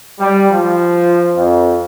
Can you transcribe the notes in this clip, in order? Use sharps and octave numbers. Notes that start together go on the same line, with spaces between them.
G3
F3
F2